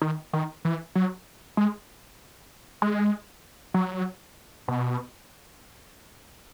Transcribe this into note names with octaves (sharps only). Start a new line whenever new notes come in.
D#3
D#3
E3
F#3
G#3
G#3
F#3
B2